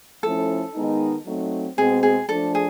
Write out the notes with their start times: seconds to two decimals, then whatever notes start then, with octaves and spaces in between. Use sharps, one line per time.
0.23 F3 A3 C#4 E4 A4
0.74 D#3 G#3 B3 D#4
1.26 F#3 A3 C4 D#4
1.77 B2 G#3 C4 G#4
2.03 G#4
2.29 F3 A3 D4 A4
2.55 G#4